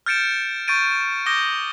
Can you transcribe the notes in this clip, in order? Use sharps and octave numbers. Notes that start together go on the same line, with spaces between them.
F6 G6 A6 C#7 D7 E7
C#6 G6 A6 D7 D#7
D6 D#6 G6 A#6 G7